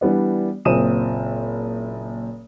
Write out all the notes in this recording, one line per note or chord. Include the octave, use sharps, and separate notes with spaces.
E3 G3 B3 D4
F#1 A#2 C4 D#6 D#7 E7